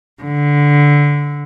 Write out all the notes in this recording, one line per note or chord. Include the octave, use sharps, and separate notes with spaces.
D3